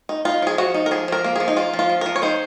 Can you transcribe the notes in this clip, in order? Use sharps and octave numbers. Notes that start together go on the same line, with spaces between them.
D#4
D#4 F4
F3 G#4
F3 F#4
D#4
A#4
F3 G#4
F3 A#4
A#3
F3 G#4
D#4
A#3 F4
F3
F4
F3
F3 A#4
C#5
D#4 C5